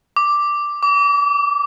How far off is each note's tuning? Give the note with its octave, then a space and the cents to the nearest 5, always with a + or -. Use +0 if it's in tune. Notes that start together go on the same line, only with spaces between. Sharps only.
D6 +0
D6 -35